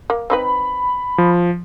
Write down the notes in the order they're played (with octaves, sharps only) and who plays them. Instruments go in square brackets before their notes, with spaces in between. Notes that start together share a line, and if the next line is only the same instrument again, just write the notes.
[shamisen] A#3
[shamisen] C4 D#4 B4 [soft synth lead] B5
[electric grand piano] F3